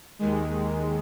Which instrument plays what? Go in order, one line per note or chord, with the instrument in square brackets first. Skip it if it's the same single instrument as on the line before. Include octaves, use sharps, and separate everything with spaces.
[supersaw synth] D#2 D#3 G#3